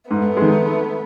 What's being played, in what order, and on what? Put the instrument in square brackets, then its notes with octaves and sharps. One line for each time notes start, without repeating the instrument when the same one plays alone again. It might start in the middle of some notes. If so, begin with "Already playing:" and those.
[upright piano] G#2 [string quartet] A3 B3
[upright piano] D#3 G#3